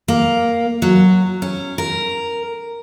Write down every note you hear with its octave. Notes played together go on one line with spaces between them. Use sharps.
A#3
F#3
C#4
A#4